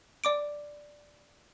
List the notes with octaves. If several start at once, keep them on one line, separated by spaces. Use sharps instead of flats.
D5 D6 D7